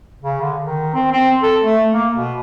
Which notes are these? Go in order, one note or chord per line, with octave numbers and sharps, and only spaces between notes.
C#3
D3
D#3
C4
C4
A4
A3
A#3
B2